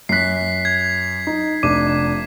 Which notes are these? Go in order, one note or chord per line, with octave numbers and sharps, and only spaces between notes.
F#2 F#6 B6 C7
G#6
D#4
F1 D4 D6 D#7